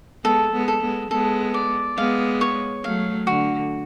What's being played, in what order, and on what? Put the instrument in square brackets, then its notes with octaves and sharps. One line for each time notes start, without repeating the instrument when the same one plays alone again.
[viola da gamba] G#3 B3 [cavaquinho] A4
[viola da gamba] G#3 B3
[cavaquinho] A4
[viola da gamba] G#3 B3
[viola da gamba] G#3 B3 [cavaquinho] A4
[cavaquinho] D5
[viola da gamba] G#3 B3 [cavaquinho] F5
[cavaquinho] C#5
[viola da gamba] F#3 A3 [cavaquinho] F5
[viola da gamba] D3 [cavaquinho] F#4